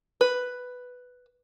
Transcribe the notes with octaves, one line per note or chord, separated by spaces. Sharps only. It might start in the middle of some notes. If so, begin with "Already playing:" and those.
B4